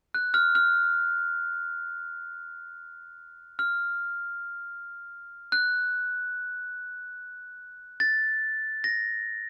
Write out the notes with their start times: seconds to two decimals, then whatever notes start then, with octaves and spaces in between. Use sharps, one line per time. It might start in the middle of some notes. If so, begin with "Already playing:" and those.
0.14 F#6
0.34 F6
0.55 F6
3.59 F6
5.52 F#6
8.00 A6
8.84 A#6